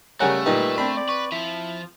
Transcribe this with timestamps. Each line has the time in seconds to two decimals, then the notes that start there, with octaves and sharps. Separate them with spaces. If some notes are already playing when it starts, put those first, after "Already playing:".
0.20 C#3 G3 A3 A#4 C#5 F#5 G#5
0.46 A#2 G3 D#4 A#4 B4 G5
0.78 C4 D4 B5
0.97 D5
1.09 B4 C#6
1.32 F3 E4 B6